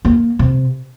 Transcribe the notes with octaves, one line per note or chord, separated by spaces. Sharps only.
A#3
C3